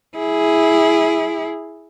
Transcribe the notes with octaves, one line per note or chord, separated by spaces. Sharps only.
E4 G#4